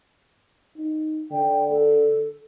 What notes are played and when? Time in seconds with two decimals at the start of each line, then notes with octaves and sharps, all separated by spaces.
0.77 D#4
1.31 D3 G5
1.71 A4